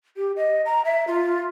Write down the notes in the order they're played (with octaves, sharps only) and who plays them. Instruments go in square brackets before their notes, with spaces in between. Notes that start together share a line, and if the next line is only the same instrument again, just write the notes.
[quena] G4
D#5
A#5
E5
F4